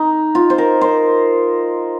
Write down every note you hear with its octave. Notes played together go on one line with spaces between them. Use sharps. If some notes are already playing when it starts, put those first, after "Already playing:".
Already playing: D#4
F4
C5
A#4
C5